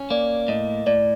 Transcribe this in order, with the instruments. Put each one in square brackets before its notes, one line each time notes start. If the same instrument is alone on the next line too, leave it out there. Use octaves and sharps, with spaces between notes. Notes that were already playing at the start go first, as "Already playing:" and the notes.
Already playing: [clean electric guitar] C#4
[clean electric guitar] A#3 [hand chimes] D5
[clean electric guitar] A2 [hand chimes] D#5
[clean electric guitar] A2 [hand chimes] D5